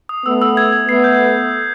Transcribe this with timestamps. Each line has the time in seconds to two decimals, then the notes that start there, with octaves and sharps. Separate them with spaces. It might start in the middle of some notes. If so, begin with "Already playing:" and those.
0.09 D#6
0.25 A3 B3 E6
0.42 E6
0.57 G#6
0.72 G#6
0.88 A3 B3 C7
1.04 G6